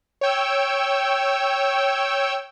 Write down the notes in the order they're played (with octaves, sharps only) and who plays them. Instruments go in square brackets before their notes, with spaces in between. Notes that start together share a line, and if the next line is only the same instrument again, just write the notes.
[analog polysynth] C#5 G5 E6